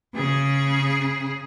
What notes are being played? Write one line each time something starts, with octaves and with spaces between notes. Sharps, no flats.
C#3 G#4